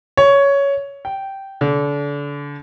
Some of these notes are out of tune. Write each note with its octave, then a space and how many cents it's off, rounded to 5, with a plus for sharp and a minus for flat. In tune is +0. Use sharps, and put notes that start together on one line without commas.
C#5 +10
G5 -10
D3 -30